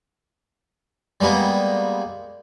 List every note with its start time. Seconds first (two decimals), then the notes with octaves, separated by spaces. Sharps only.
1.21 G3 G#3 A#3 B3